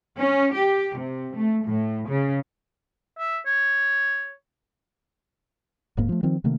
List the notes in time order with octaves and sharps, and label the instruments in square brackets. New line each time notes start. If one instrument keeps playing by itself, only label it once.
[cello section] C#4
G4
C3
A3
A2
C#3
[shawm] E5
C#5
[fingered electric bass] D1 G#2 A#3
F3 A3
D#3 F3 C4
C3 D#3 A3 A#3